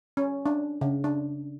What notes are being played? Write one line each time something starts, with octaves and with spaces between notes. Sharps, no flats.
C#4
D4
C#3
D4